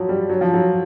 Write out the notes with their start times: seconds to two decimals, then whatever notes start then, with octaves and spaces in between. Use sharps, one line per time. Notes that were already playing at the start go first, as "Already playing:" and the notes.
Already playing: F3 F#3
0.09 G3
0.30 F#3
0.41 F3
0.54 F#3